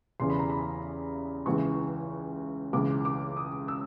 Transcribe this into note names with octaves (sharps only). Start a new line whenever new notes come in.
E2 C#3 E3 C6
B5
A#5
B5
C#2 C#3 E3 C#6
C#2 C#3 E3 D6
D6
D#6
E6